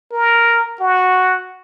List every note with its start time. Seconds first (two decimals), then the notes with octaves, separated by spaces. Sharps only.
0.12 A#4
0.80 F#4